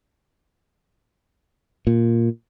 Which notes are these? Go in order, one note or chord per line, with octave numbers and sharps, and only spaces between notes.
A#2